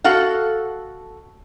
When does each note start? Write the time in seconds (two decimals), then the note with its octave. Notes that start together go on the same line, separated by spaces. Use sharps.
0.04 F#4 A4 F5 F#5